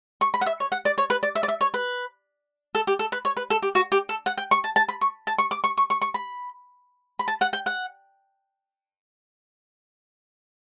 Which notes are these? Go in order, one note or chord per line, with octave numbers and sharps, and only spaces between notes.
C#6
B5
F#5
E5
C#5
F#5
D5
C#5
B4
D5
E5
D5
E5
C#5
B4
A4
G4
A4
B4
C#5
B4
A4
G4
F#4
G4
A4
F#5
G5
C#6
A5
A5
B5
C#6
A5
C#6
D6
C#6
C#6
C#6
C#6
B5
B5
A5
F#5
G5
F#5